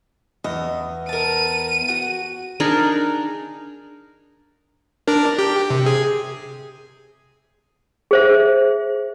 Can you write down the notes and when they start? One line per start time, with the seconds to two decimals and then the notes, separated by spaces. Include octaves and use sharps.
0.44 E2 D#5
1.09 A#4 A5 D#7
1.89 F#4
2.60 D4 D#4 G#4 A#4
5.07 D4 A#4
5.38 G4
5.70 C3
5.86 G#4
8.11 G#4 C5 E5